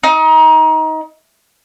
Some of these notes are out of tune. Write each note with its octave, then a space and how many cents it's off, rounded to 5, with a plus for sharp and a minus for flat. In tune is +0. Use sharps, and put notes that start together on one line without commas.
D#4 +25